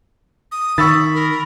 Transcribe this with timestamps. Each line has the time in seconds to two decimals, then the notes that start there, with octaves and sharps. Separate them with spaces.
0.52 D#6
0.78 D#3 B5 C#6 E6 A6
1.15 A#4